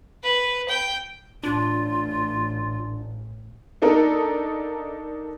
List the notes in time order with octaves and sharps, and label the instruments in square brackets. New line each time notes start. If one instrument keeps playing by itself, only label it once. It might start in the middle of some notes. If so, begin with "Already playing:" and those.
[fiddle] B4
G5
[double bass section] A1 [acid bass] D4 [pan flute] F4
[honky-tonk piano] A#3 D4 D#4 A4 A#4